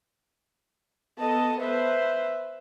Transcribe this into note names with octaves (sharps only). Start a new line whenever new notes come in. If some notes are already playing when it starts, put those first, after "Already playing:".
B3 A4 D#5 A5
B4 C5 E5